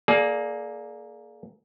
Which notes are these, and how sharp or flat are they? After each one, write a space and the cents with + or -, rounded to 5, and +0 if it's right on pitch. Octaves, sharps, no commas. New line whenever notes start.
A#3 +0 G#4 +35 D5 +0